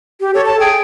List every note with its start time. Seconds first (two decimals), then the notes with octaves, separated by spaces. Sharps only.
0.20 G4
0.34 A4 C#5
0.46 A5
0.60 G#4 G5